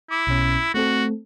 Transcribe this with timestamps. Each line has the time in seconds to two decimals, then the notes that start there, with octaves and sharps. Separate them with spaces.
0.11 E4 D6
0.27 B1 B2 C#4
0.74 A3 C4 F#4 A4